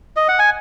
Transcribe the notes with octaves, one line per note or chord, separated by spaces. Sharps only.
D#5
F#5
G#5